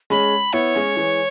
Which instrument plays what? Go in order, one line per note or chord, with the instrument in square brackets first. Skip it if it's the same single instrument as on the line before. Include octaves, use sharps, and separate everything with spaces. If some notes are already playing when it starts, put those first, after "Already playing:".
[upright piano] G#3 C#4 [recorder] B5
[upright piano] B3 E4 [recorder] C#5
[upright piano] G#3 C#4
E3 G#3